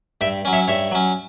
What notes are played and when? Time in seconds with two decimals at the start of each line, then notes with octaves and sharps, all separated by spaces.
0.21 G2 E5 G5
0.45 F#3 C#4
0.53 C#5 E5
0.68 G2 C#5 E5
0.91 F#3 C#4